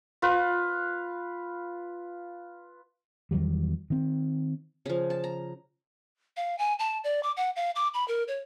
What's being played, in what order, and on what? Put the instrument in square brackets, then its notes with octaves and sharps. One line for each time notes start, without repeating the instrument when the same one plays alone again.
[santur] F4 B4
[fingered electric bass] E2 D#3 F#3 G3
D#3 C4
[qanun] C#3 F3
A5
A#5
[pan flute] F5
G#5
A5
D5
D6
F#5
F5
D6
B5
A#4
C#5